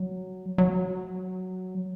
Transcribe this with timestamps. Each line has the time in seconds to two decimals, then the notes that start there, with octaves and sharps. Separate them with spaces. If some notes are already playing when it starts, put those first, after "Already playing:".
Already playing: F#3
0.58 F#3